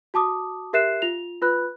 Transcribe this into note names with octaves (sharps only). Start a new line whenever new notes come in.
F#4 A5 D6 D#6
G4 A#4 E5 F#6 C7 E7
F4 F7
F4 B4 B5 F#6